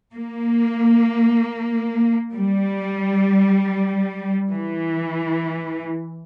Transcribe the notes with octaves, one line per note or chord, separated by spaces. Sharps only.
A#3
G3
E3